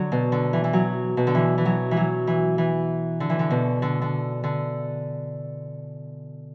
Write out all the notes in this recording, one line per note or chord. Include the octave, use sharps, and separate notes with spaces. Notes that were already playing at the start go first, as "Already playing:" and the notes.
Already playing: D3 F#3
B2
D3
E3
E3
F#3
B2
D3
E3
E3
F#3
E3
F#3
E3
E3
D3
E3
D3
B2
D3
D3
D3